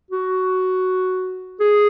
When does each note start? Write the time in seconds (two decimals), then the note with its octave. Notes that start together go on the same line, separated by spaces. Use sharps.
0.11 F#4
1.60 G#4